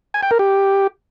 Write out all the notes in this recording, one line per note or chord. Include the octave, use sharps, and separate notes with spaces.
G#5
G5
A#4
G4